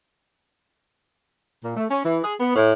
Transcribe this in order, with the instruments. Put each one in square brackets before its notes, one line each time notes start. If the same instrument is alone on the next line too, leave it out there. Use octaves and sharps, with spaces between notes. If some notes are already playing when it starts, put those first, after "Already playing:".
[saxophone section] A#2
A3
C#4
E3
G#4
B3
A2